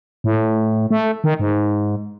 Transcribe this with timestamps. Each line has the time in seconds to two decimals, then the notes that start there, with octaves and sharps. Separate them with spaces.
0.24 A2
0.90 A3
1.24 D#3
1.39 G#2